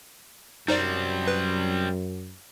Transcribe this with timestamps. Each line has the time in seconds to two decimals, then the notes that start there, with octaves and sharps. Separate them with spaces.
0.68 F#2 G3 C4 D#4 C5 D5
1.28 B4